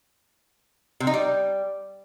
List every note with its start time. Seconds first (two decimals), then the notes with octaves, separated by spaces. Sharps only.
1.00 C3
1.07 D#4
1.14 G3